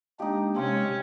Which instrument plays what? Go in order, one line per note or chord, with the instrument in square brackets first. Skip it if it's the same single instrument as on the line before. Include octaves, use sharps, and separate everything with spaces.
[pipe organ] G#3 A#3 D4 [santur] D#4 G4
[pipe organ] C3 G#3 [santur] C4 F5 [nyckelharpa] C#4